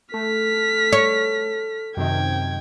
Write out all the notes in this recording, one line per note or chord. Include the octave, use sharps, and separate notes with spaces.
A3 A4 F6 B6
C#5
F#2 C3 D#3 G5 G#6